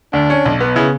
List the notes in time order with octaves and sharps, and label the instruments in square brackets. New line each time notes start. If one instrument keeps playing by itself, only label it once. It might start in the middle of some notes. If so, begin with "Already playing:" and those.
[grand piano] D2 [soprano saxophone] D4
[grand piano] C#4
B1
B3
[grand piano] C#3 [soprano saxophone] E4